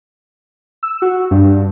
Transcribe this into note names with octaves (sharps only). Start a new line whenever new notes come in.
E6
F#4
G2